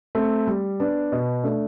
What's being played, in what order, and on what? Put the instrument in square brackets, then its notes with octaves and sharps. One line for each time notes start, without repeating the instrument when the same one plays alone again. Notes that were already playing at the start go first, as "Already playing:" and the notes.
[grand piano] A3 C4
G3
B3 D4
B2
A3 D4